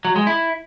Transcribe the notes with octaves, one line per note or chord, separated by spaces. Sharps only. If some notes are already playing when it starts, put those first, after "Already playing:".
F#3
G#3
E4